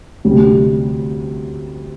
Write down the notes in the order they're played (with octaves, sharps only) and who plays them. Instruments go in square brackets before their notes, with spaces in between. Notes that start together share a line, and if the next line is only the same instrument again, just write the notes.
[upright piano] D2 C3 G3